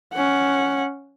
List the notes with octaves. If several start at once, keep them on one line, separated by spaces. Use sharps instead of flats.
C#4 F#5